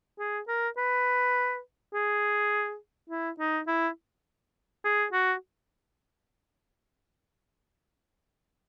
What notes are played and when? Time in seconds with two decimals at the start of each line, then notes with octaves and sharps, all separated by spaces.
0.19 G#4
0.48 A#4
0.77 B4
1.94 G#4
3.10 E4
3.39 D#4
3.68 E4
4.84 G#4
5.13 F#4